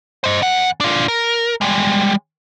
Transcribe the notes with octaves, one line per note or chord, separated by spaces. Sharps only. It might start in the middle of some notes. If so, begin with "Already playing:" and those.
C5 D#5
E2 F#5
D4 F4
A#4
G3 G#3